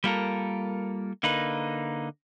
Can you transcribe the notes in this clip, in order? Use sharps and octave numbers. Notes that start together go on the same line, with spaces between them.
G3 A#3 F4 A4 A#4
D3 A#3 D#4 B4